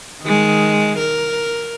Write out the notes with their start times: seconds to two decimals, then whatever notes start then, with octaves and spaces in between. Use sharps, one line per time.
0.22 D#3 G#3
0.98 A#4